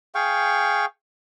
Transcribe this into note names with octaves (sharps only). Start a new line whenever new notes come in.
G#4 F5 G5 C#6